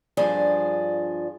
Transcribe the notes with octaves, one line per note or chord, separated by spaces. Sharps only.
G2 F3 D4 G#4